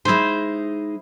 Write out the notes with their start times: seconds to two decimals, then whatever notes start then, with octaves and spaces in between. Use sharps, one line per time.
0.05 G#3 D#4 E4 C5